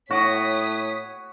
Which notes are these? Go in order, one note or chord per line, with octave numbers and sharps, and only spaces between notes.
A2 F#4 C#5 D#6 B6